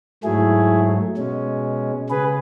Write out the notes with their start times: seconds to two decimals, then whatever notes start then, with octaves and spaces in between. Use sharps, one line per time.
0.24 G#2 F#3 A3 E4 G#4
1.17 B2 G#3 C#4
2.10 C#3 G#4 B4